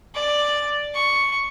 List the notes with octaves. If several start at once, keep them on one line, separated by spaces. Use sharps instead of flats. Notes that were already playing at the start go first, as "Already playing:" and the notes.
D5
C#6